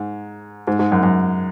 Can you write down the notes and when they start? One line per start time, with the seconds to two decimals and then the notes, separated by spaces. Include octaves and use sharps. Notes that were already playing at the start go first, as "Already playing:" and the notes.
Already playing: G#2
0.67 G#2
0.79 G#2
0.92 F#2
1.03 F#2